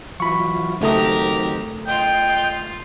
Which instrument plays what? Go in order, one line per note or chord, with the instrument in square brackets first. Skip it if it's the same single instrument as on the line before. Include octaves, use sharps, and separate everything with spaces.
[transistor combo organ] E3 F#3 F4 [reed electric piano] B5 C#6
[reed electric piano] C#2 A3 D#6 [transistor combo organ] D#3 F#3 C4 [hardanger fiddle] G4 A#4
[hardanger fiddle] F4 [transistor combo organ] D#5 [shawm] G5